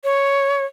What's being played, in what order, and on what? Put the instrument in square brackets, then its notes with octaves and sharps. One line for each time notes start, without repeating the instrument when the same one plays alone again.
[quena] C#5